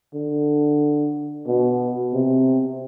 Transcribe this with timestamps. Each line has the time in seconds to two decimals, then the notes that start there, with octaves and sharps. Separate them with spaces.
0.14 D3
1.48 B2
2.14 C3